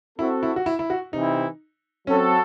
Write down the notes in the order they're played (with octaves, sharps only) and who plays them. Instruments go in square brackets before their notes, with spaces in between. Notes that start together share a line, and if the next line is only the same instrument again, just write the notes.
[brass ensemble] C4 F#4 A4 [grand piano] E4
[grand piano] E4
F#4
E4
E4
F#4
[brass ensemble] C3 E3 C4 E4 [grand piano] D#4
[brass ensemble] F#3 C4 F#4 A4 [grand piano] C#4